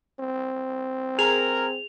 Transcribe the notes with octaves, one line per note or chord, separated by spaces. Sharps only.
C4
G#4 A#4 F7